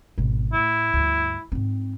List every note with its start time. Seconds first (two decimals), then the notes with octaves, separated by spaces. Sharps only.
0.18 G#1 B2
0.53 A2 E4
0.93 D2 G2
1.52 G#2 C4